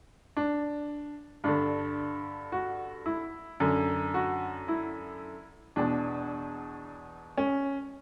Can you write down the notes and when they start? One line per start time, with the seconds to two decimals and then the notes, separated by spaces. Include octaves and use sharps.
0.37 D4
1.44 G2 D3 D4
2.52 F#4
3.06 E4
3.60 F#2 D3
4.14 F#4
4.68 E4
5.76 E2 B2 D4
7.38 C#4